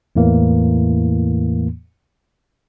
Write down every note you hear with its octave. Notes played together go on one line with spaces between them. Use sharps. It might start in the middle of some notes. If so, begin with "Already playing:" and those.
E2 A2 E3 A#3